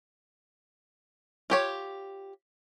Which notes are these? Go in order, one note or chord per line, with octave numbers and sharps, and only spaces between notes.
F4 G4 C#5